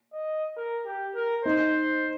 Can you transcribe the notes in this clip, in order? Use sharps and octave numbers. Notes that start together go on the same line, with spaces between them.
D#5
A#4
G4
A#4
D#4 C5